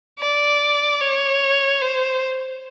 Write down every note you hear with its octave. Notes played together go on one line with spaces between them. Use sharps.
D5
C#5
C5